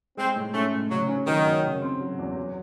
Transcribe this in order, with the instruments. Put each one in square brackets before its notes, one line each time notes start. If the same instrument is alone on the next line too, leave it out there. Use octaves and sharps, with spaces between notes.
[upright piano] G#3 [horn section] C4
[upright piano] A2
[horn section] A3 [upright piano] C#4
[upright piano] A2
[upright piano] C#3 [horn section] F#3
[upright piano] C#4
[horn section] D#3 [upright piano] F#3
[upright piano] F#2
C#3
C4
F#3
E2
F#3